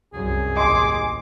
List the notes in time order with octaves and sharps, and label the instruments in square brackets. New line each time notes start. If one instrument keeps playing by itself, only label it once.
[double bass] C2 F#2 [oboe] G#4
[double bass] A1 D#2 [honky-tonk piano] D#5 G#5 C6 [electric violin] D6